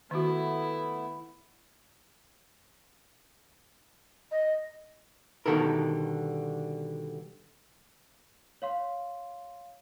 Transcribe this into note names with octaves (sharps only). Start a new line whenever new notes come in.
D#3 A3 B3 E4 F#4
D#5
B2 D3 D#3 G3 A4 A#4
C#5 F5 C6